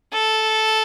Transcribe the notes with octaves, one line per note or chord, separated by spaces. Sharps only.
A4